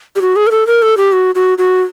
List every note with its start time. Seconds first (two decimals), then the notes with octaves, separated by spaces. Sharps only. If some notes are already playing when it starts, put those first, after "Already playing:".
0.16 G4
0.21 F#4
0.36 G#4
0.47 A#4
0.51 A4
0.67 A#4
0.82 A4
0.97 G4
1.12 F#4
1.35 F#4
1.58 F#4